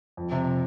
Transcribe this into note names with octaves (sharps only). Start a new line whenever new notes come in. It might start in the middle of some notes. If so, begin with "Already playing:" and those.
F2
C3